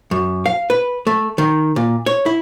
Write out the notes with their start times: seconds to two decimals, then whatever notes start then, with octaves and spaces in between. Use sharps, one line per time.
0.11 F#2
0.46 F5
0.70 B4
1.07 A3
1.38 D#3
1.76 A#2
2.06 C#5
2.26 E4